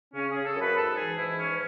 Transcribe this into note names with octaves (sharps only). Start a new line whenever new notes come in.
C#3 C#4
G#4
C#3
A4
F#2
B4
G#2 A4
E3 G#4
G#2 E4
E3 C#4